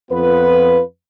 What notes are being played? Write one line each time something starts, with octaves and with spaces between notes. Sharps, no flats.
F2 B3 F4 B4